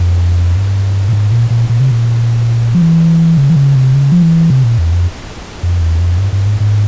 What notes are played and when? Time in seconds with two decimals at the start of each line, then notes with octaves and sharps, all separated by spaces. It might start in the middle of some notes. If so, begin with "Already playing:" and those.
Already playing: F2
0.56 G2
1.09 A#2
1.13 G#2
1.32 A#2
1.50 A#2
1.69 A#2
1.80 C3
1.91 A#2
2.75 F3
2.81 E3
3.37 C#3
3.50 E3
3.56 C#3
3.75 C3
3.94 C#3
4.12 F3
4.22 E3
4.50 C3
4.64 A#2
4.78 E2
4.92 F2
5.63 F2
5.81 E2
6.00 F2
6.18 G2
6.32 G2
6.46 G#2
6.60 G#2